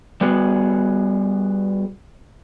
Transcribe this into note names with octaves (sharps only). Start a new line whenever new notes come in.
G3 B3 F#4 G#4